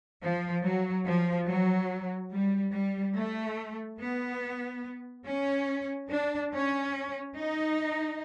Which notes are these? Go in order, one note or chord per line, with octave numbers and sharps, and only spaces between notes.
F3
F#3
F3
F#3
G3
G3
A3
B3
C#4
D4
C#4
D#4